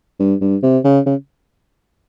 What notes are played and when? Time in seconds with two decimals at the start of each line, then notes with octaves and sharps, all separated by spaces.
0.19 G2
0.41 G2
0.63 C3
0.84 C#3
1.06 C#3